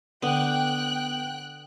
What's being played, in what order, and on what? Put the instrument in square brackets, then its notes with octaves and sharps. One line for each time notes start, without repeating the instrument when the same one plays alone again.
[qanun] D3 [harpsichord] B3 [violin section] G5 F#6